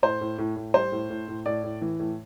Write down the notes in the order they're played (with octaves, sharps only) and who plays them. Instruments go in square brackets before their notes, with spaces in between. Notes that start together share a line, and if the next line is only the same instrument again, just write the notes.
[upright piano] A2 C5
A2
A2
A2
G3 C5
A2
A2
A2
A2 D5
A2
E3
A2